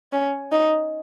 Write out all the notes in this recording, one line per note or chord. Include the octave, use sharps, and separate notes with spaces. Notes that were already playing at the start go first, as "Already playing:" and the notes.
C#4
D#4